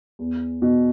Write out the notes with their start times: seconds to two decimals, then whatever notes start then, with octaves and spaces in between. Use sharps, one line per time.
0.19 E2
0.62 B2